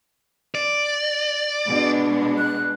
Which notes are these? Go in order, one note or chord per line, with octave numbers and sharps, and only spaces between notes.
D5
B2 G#3 D4
F#6